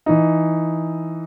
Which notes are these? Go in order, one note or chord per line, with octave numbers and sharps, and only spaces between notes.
E3 D#4